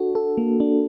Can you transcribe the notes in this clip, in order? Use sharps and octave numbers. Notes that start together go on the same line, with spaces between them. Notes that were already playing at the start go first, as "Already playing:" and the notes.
Already playing: D4 F#4 A4
A4
A#3
D4